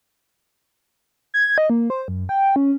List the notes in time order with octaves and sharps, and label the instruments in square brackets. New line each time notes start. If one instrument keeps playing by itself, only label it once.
[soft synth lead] G#6
D#5
A#3
C5
F#2
G5
C#4